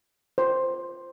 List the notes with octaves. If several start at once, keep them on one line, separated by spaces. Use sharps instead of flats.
C5